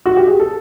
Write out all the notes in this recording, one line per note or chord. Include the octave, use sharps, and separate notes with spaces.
F#4
G4
G#4
A4